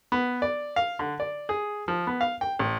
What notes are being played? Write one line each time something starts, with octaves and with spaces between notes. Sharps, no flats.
B3
D5
F5
D3
D5
G#4
F3
B3
F5
G5
A1